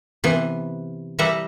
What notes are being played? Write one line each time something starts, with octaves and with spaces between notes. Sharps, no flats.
C3 E3 B3
E3 G3 E5 F#5 A#5